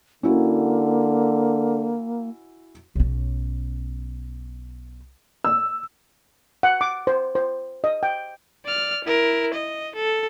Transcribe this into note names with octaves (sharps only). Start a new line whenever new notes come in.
D3 A#3 C#4 E4 F#4
B1 C#4
E6
F#5
D6
C5
C5
D#5
G5
D5 F6
E4 A#4
D#5
A4